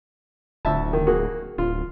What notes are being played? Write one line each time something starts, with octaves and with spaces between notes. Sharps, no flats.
D1 D2 E5 A5
D#3
A#3 F#4 G#4
D1 F4